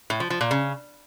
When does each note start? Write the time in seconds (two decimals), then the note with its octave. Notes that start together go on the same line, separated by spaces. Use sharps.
0.10 A2
0.20 F3
0.30 F3
0.41 A#2
0.51 C#3